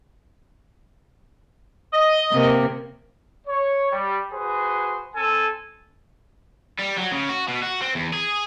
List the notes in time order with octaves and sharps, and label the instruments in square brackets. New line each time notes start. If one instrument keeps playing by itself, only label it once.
[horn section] D#5
[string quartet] C3 A#3
[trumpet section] C#5
G3
F#4 G#4 B4 C5
C4 A4 G#5 A5
[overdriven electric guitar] G3
F#3
C#3
F#4
B2
F#4
C4
E2
G#4